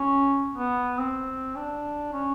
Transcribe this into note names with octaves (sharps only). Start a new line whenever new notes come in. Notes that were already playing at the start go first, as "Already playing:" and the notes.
Already playing: C#4
B3
C4
D4
C#4